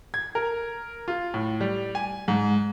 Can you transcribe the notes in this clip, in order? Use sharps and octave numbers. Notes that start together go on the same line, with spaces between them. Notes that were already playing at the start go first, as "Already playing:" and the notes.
G#6
A#4
F4
A2
G3
G#5
G#2